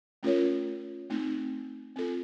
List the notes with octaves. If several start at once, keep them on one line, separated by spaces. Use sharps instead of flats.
A3 C#4 F4 A#4 C#5
A3 C4 D#4
C4 F4 A4